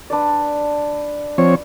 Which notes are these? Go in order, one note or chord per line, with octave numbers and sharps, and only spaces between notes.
D4 B4 D5
F3 C4 C#5